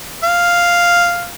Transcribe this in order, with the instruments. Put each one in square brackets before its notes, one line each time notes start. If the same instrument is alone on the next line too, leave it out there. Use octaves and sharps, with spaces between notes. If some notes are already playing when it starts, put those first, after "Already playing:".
[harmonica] F5